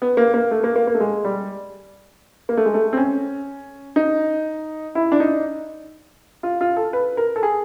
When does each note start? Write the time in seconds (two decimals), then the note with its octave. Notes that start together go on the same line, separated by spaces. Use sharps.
0.02 B3
0.17 A#3
0.34 A#3
0.51 A3
0.64 A#3
0.76 A#3
0.87 A#3
0.95 A3
1.00 G#3
1.25 G3
2.49 A#3
2.57 A3
2.65 G#3
2.74 A3
2.93 C4
2.97 C#4
3.96 D#4
4.95 E4
5.12 D4
5.20 D#4
6.43 F4
6.61 F4
6.77 A4
6.93 B4
7.17 A#4
7.36 A4
7.43 G#4